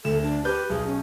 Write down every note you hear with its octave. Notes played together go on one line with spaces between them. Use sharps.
D2 A4 E7
D4
G4 B4 G6
B1 G#4
C#4